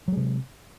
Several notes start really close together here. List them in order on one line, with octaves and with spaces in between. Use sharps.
F#3 G#3 C3